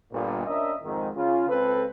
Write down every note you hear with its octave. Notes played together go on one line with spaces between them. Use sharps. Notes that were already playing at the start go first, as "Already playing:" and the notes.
G1 A#2
C#4 D4 A#4 D#5 E5
F2 G#2 D#3
C#3 F4
C#2 C4 A4 B4